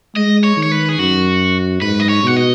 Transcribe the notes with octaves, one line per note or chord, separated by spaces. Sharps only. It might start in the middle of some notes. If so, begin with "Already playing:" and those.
G#3 D#5
C#5
D#3
C#5
B4
G#4
F#2 F#4
G#2 B4
D#5
C#5
B2 F#5
D#5